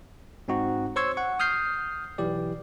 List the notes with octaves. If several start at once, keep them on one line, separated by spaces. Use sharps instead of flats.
G#2 C4 D#4 F#4
C5 C#5 C6 C#6 E6 G#6
F#5 C#6
D#6 F6 G6 C7
B1 E3 G4 D5